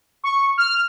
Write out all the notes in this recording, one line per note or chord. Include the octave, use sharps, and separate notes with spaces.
C#6
F6